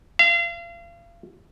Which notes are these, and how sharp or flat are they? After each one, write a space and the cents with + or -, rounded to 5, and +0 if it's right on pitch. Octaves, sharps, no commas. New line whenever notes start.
F5 -35